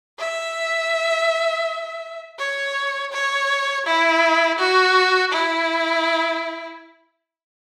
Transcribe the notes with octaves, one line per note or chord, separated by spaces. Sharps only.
E5
C#5
C#5
E4
F#4
E4